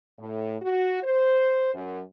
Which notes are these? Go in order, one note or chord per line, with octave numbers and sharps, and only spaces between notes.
A2
F#4
C5
F#2